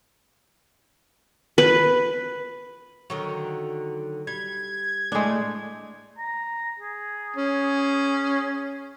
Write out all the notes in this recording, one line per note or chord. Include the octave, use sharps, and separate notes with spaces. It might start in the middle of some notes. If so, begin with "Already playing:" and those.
B4
D3 D#3 F#3
G3 G#6
A2 G#3 A3 D4
A#5
G#4
C#4